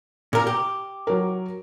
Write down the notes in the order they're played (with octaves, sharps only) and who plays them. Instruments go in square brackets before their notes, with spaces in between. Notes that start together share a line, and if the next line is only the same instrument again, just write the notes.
[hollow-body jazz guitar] A#2 A#4
G4
[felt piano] F#3 A#4